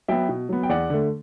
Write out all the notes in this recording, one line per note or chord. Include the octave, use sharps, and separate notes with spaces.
F#3 B3 E5 G5
B2
F#3 B3
G5
E2 D5 F#5
D3 A3